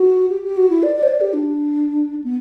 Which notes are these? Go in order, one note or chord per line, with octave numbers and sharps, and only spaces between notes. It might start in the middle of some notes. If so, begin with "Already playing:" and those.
Already playing: F#4
G4
G4
F#4
E4
D5
D5
C5
D5
G4
D4
B3